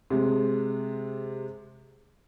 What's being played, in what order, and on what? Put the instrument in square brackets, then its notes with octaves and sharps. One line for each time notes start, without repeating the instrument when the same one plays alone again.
[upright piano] C3 G#3